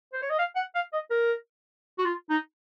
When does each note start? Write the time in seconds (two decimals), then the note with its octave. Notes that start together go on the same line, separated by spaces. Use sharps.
0.13 C5
0.22 C#5
0.30 D#5
0.39 F5
0.56 F#5
0.75 F5
0.93 D#5
1.10 A#4
1.98 F#4
2.05 F4
2.30 D#4